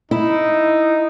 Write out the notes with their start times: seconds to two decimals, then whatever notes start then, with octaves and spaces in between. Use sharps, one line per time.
0.11 D#4 E4